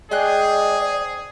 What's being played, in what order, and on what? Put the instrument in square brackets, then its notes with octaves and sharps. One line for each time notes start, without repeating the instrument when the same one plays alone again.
[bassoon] G#3 [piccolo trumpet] G#4 [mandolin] C5 G5 F#6 [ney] D5